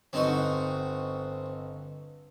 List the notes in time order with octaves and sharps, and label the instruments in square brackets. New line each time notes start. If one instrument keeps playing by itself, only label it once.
[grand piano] G1 D#5 [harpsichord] C4 D#4 F#4